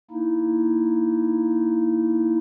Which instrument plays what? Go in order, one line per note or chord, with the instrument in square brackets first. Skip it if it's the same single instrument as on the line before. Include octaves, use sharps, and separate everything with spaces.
[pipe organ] A#3 D#4 E4